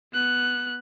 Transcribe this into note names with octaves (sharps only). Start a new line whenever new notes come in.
B3 F#6